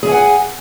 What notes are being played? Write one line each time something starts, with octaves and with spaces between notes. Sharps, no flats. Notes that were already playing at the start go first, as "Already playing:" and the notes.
G#4 E5 F#5 G#5